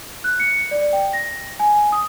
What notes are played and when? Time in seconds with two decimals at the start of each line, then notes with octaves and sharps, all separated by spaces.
0.24 F#6
0.40 C#7
0.71 D5
0.93 G5
1.13 A#6
1.59 G#5
1.92 D#6